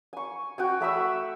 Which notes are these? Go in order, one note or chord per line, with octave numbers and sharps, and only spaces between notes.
G#5 C#6
F#4 G5 G#5
A3 E5 B5 E6